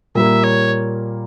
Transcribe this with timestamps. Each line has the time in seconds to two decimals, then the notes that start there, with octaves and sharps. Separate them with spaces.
0.15 A#2 G3 A#3 E5
0.44 C#5